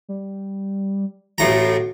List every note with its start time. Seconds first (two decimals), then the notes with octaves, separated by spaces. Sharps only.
0.09 G3
1.38 A1 A2 F#4 A#5